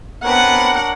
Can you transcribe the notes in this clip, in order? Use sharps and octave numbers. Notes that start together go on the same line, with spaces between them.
B3 C4 D4 A#4 B4 C#5 F#5